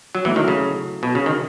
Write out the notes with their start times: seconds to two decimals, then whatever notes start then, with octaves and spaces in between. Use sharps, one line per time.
0.15 F#3
0.25 E3 F#3 A3 E4
0.36 D#3
0.48 C#3
1.03 B2
1.15 C#3
1.26 D#3